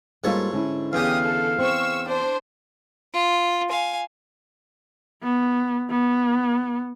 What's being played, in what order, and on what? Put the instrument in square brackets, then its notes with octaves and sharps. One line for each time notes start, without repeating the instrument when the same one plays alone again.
[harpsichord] G#2 A4 C#5 [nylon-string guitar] G3 A#3 F4
[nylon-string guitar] D3 C#4 E4
[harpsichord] E2 C#3 G5 [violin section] G4 D#6 [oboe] F5
[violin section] A4
[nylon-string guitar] C4 [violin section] C#6 E6
[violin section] D4 C5
[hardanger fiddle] F4
F5 G#5
[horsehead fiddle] B3
B3